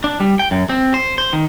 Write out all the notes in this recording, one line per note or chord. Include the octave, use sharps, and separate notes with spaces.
D4
G3
G5
F#2
C4
C5
C5
D#3